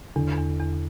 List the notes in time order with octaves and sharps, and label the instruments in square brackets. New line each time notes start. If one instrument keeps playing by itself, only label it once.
[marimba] E2 [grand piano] D3
[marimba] E2
E2